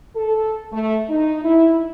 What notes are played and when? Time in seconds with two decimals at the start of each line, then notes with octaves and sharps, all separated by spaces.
0.16 A4
0.72 A3
1.09 D#4
1.43 E4